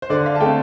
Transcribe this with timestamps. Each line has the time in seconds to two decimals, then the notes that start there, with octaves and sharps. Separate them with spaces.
0.02 C5
0.10 D3 D5
0.26 F5
0.35 A5
0.40 A3 C4 G5